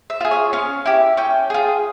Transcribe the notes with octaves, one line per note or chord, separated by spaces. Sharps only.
E5
F4 G#4
C#5
C#4 F5
E4 G4
C#4 G5
F4 G#4